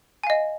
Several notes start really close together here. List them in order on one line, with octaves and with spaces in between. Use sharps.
G#5 F5 D#5